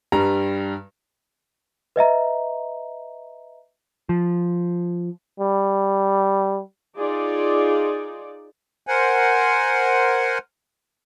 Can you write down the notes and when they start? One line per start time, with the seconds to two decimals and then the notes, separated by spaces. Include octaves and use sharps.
0.12 G2 G3 A#5
1.96 B4 D#5 E5 A#5
4.09 F3
5.40 G3
6.98 D#4 F4 G#4 D5
8.87 A#4 C5 F#5 G#5